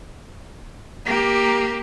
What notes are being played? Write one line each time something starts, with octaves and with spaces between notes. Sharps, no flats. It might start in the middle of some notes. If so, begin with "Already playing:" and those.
A#3 G4